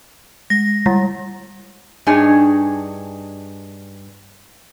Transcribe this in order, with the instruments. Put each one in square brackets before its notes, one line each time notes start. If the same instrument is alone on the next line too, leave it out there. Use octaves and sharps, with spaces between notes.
[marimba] G#3 [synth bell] A#6
[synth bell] G3 [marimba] A#5
[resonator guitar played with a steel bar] G2 D4 D#4 G#4 C#5 G#5